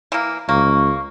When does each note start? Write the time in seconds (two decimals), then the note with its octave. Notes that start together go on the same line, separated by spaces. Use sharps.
0.12 E3 A#3
0.49 C#2 A#3 C#6